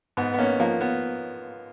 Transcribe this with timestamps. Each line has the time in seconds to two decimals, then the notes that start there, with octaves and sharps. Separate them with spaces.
0.17 G#2 B3
0.34 B3
0.39 A#3 C#4
0.60 F3 A#3
0.81 B3